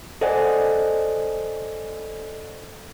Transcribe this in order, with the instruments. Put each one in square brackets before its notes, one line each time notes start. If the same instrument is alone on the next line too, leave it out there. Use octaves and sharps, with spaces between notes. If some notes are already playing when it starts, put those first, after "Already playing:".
[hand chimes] A4 C5 D5 D#5 F#5 G#5